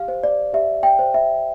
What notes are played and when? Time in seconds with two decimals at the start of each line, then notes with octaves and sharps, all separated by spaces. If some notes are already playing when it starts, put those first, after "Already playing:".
Already playing: G4 F5
0.08 C5
0.23 D5
0.53 G4 E5
0.83 G5
0.99 C5
1.14 E5